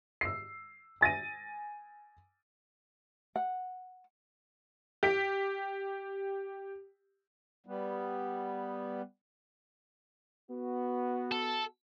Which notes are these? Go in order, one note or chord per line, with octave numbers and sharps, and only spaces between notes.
E6 C7
G#5 A6 A#6 D#7
F#5
G4 B6 D7
G3 B3
B3 F#4
A4